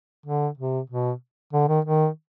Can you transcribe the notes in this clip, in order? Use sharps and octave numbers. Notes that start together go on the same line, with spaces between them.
D3
C3
B2
D3
D#3
D#3